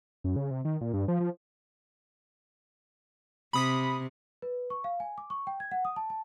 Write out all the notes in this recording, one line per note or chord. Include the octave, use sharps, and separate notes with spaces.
F#2
C#3
C3
D#3
A#2
G2
F3
F3
C3 B5 D#6 B6
B4
C#6
F5
G#5
D6
C#6
G5
G#6
F#5
D#6
A5
A5